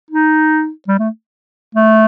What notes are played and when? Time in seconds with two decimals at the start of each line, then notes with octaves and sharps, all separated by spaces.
0.11 D#4
0.88 G3
0.99 A3
1.75 A3